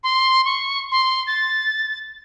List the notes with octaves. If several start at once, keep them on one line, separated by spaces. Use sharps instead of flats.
C6
C#6
C6
A6